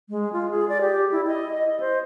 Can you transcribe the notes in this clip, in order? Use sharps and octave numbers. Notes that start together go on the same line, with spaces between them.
G#3
F4
G#4
D5
G4
E4
D#5
D#5
C5